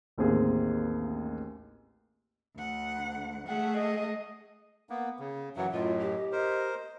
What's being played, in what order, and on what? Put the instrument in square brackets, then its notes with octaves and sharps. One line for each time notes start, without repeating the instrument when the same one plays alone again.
[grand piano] A1 D#2 A#3 C4 G#4
[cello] D2 F#5
[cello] A3 G#4 [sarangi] F#5
[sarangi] D#5
[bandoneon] A#3 B3
C#3
[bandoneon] F#2 E3 F#3 [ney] E5 [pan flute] F#5
[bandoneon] F#2 A2 [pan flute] F4 [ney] D#5
[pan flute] G4
[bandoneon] A#4 C5 [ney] D#5